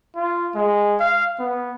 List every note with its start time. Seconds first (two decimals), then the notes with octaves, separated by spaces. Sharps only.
0.16 F4
0.55 G#3
1.00 F5
1.39 B3